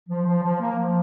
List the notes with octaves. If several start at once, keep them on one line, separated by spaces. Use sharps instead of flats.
F3
F3
F3
A#3
F3